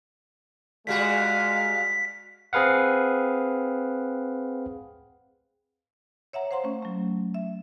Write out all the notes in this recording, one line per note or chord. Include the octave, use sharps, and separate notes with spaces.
A#2 G3 G#3 F#4 F5 B6
C4 G#4 B4 F5 F#5
C#5 E5 F#5 A#5
C5 F5 F#5 A#5 C6
A3 C#4
F#3 A3
E5